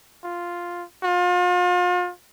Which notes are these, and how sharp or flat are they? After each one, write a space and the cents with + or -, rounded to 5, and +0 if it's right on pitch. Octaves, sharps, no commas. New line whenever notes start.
F4 +0
F4 +40